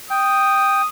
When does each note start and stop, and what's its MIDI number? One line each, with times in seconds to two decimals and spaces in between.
0.10 0.82 79
0.10 0.88 87